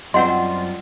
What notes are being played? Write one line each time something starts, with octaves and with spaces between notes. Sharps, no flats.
F#2 G3 C4 F4 C5 D#5 F#5 C6